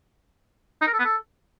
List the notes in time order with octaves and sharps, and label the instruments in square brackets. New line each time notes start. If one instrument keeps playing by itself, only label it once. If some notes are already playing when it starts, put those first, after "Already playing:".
[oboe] D#4
A#4
A4
B3
A4